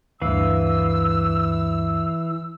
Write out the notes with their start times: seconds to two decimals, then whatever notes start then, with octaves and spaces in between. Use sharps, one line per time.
0.22 D2 G2 E3 F5 E6